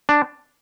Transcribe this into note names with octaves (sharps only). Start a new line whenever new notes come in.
D4